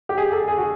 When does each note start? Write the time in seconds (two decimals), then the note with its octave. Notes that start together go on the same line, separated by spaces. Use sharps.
0.09 G4
0.18 G#4
0.32 A4
0.48 G#4
0.57 F#4